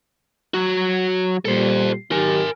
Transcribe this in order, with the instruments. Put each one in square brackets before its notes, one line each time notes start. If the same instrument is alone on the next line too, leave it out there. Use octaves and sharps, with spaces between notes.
[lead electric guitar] F#3 F#4
[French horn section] A#2 G3 [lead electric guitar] A4 C5
[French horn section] D#3 F#3 G4 [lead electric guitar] A#4 G#5